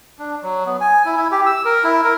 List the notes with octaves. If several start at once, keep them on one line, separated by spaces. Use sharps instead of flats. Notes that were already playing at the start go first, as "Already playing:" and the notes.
D4
F#3
B3
G#5
E4
E4
G4
E6
A#4
E4
A#4